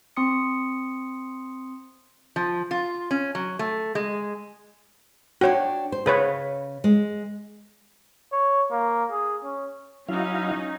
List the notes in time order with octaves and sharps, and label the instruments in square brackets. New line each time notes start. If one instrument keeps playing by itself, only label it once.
[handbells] C4 C6 D#6 C#7
[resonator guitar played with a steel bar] F3
F4
C#4
F#3
A3
G#3
[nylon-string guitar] D4 G5 [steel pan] F#4 C#5
[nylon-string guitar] C5
[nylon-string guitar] C#3 [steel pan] G#4 B4 C#5
[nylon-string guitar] G#3
[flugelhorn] C#5
A#3
G#4
C#4
[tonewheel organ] F#3 E4 F5 [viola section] C#4 D#4